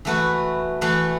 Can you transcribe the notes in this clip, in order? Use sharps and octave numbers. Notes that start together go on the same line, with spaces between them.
E3 A3 F#4 B4
E3 A3 F#4 B4